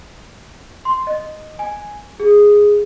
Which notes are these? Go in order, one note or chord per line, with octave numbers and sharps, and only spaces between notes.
C6
D#5
G#5
G#4